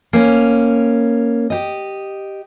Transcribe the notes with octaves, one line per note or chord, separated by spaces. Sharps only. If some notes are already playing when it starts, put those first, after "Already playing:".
A#3 C#4
G4 D#5